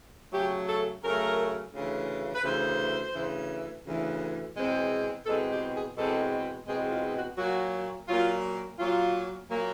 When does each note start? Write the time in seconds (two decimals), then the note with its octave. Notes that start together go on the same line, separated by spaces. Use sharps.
0.33 C#3 F#3 A3 G4
0.68 A4
1.03 C#3 F#3 A3 A#4
1.74 D2 C#3 E3
2.35 B4
2.44 D2 C#3 E3 C5
3.15 D2 C#3 E3
3.85 D2 C#3 E3
4.55 E2 B2 G#3 C4
5.26 E2 B2 G#3 C4 A4
5.50 G4
5.73 G#4
5.97 E2 B2 G#3 C4 A4
6.67 E2 B2 G#3 C4 G#4
6.90 F4
7.15 F#4
7.38 A#2 F#3 A#3 F#4
8.08 A#2 F#3 A#3 F4
8.78 A#2 F#3 A#3 F4
9.49 A#2 F#3 A#3